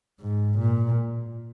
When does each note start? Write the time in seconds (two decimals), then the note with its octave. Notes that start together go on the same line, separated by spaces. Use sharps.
0.21 G#2
0.58 A#2